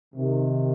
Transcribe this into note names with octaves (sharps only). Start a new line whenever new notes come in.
C3 D#3